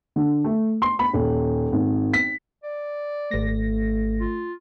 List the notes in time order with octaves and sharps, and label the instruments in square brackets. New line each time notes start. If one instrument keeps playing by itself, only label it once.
[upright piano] D3
A3
C6
B5
D#1
G#1
B6
[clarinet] D5
[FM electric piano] G#1 A#6 [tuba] A3
[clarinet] F4